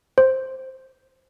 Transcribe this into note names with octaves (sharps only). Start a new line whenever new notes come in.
C5